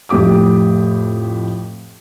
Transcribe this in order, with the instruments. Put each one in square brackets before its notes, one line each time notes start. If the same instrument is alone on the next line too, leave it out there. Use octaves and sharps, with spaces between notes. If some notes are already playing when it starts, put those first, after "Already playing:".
[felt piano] F2 A2 G4 D6 D#6